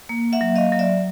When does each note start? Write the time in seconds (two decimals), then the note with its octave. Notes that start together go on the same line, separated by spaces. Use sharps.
0.09 A#3
0.33 E5 F#5
0.41 F#3
0.56 D#5 F5
0.72 F#3
0.79 D5 E5